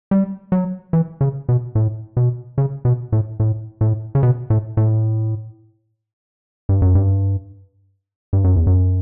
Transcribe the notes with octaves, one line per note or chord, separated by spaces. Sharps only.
G3
F#3
E3
C#3
B2
A2
B2
C#3
B2
A2
A2
A2
C#3
B2
A2
A2
G2
F#2
G2
G2
F#2
E2
F#2